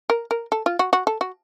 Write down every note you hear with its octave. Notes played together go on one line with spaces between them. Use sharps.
A#4
A#4
A4
F4
F#4
F#4
A4
F#4